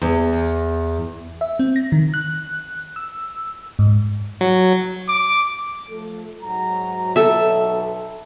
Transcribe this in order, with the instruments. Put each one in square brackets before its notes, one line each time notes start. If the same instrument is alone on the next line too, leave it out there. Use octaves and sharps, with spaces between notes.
[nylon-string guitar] E2
[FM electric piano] E5
C4
A#6
D#3
F#6
E6
G#2
[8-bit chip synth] F#3
[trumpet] D6
[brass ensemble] F3 A3 A4
G#2 F#3 A#5
[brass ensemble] B1 [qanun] A4 E5